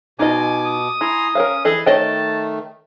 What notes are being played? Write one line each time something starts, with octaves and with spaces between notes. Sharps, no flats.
B2 D#4 F4 D#5 G#5 D6
D#6
E4 G#5 A#5 C6
C#4 A#4 C#5 F5
E3 G#4 A4 D#5
D#3 A3 C#5 D#5 G5 A5